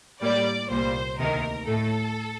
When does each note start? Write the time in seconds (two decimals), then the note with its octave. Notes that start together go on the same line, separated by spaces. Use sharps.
0.22 A2 G3 A#3 D5
0.70 C2 A#2 G3 A#3 C5
1.18 D2 C3 D#3 A#3 A#4
1.67 A2 A3 A4